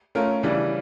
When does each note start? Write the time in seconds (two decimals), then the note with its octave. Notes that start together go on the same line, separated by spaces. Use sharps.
0.15 A3 C#4 F4 A#4
0.43 C#3 E3 G3 D4